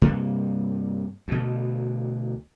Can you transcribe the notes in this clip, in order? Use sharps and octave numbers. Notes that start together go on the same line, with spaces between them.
G2 C3 A#3
D2 B2